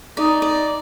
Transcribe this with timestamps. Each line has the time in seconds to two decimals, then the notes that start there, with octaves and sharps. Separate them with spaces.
0.17 D#4 D5
0.42 D5